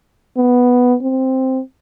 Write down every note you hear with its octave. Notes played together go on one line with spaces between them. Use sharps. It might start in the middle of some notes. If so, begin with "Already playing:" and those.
B3
C4